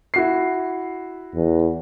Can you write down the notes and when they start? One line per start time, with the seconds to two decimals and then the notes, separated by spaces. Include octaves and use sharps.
0.14 E4 F#4 C7
1.35 E2